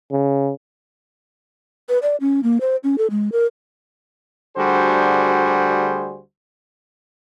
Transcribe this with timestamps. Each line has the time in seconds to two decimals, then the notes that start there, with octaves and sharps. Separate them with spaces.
0.11 C#3
1.89 B4
2.03 D5
2.20 C#4
2.43 A#3
2.61 C5
2.84 C#4
2.98 A4
3.11 G#3
3.32 A#4
4.57 D2 D3 G3 F#4 G#4 C5